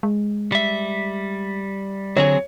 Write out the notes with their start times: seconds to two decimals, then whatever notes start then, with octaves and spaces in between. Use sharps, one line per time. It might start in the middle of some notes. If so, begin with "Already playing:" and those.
0.03 G#3
0.52 G3 E5
2.17 D3 F#3 C4 G#4 C#5